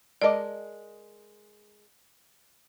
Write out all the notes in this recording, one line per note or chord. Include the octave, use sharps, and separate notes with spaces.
G#3 A#4 D5 D#5 A5 D6